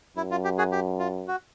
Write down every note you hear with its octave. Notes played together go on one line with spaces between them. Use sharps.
F#2 E4
F4
G4
F#4 G#4
G4
F4
F#4